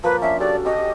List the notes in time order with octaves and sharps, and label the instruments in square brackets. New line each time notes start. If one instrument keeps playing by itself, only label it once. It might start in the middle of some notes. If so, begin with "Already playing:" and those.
[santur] F3 A#3 [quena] B4
[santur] C#4 D4 [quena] E5
[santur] F#4 G4 A4 [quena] D5
[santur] F#4 G4 E6 [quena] D#5